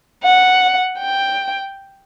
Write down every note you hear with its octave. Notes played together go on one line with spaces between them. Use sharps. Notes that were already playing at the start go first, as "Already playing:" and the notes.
F#5
G5